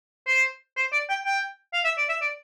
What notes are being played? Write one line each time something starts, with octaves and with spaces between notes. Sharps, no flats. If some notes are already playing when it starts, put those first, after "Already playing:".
C5
C5
D5
G5
G5
F5
E5
D5
E5
D5